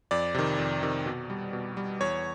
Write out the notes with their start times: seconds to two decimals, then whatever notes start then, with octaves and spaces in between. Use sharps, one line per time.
0.11 F2 D5
0.35 C3 D#3
0.59 F2
0.83 C3 D#3
1.06 B2
1.30 G3
1.53 B2
1.77 G3
2.01 E2 C#5